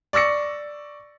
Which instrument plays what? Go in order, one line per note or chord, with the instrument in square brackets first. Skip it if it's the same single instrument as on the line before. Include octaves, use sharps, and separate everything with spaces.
[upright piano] D5 C#6 E6 A#6 C#7